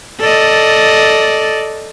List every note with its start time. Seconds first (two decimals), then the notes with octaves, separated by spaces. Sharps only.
0.20 A4 D5 D#5